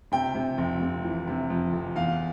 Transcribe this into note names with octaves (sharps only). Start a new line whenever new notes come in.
C3 G5
C3
F1
C3
E3
C3
F2
F1
E2 F5